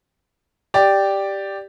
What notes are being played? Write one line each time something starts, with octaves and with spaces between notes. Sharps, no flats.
G4 D5